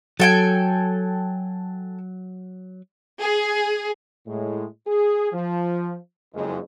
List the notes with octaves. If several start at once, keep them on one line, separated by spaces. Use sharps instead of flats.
F#3 A4 G5 G#5
G#4
A2 G#3
G#4
F3
F#1 F2 G#3